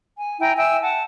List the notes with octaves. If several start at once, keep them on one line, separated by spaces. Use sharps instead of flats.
G#5
E4 G5 G#5 A#5
E5 G5 G#5 E6
F#5 A5